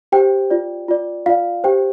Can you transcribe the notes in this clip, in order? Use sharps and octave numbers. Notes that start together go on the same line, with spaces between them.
G4 C5 G5
F4 D5
F4 D5
F4 D5 F5
G4 C5 G5